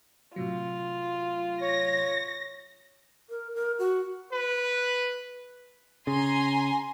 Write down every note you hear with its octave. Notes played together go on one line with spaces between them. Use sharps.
A2 C3 F#3 F4
C#5 A#6
A#4
A#4
F#4
B4
C#3 G#5 A#5 C6